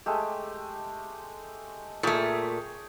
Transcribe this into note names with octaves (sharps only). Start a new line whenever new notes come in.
G#3 A3 G4
A#2 A3 G#4 C#5 G5